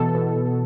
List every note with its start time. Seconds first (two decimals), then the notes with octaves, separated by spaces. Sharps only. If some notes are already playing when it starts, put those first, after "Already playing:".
Already playing: B2 E3 A4
0.15 B2
0.36 B2